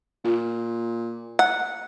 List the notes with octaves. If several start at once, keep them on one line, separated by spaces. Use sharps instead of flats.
A#2 F4
F#5